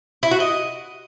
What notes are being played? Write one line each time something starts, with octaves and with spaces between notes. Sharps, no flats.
E4
F#4
D#5